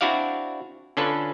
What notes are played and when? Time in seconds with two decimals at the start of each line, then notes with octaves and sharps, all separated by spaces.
0.01 C4 D4 E4 F#4 D5 F5
0.97 D3 C#4 D4 F4 A4 B4